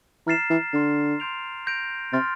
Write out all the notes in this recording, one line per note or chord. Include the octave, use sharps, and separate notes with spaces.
E3 A#5 F6 A6 C7 E7
E3
D3 C6 F6 A6
C6 G6 D7 F7
G6 A#6 D7 F7
C3 C6 F6 A6